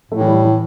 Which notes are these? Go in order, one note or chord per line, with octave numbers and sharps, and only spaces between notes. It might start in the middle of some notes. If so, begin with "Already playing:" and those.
A2 A3
E3
G3
E3